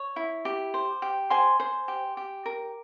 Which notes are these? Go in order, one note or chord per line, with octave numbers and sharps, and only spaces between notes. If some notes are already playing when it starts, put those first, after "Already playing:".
Already playing: C#5
E4
G4
C5
G4
C5 G#5 C6
C5
G4
G4
A#4